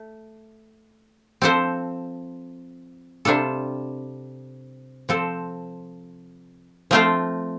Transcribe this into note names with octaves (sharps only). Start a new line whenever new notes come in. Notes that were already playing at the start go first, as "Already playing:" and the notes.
Already playing: A3
F3 C4 A4 C5
C3 G3 D4 F4 A4
F3 C4 A4 C5
F3 A3 C4 F4 C5